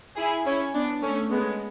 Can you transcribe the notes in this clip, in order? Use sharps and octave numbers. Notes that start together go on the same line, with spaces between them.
E4 G#4
C#4 E4
B3 D4
A3 C#4
G#3 B3